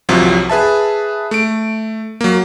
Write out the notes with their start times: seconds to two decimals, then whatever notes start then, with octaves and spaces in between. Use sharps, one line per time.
0.09 G1 C2 C3 F3 F#3
0.50 G#4 B4 E5 A5
1.31 A3 D7
2.21 F#3 A#3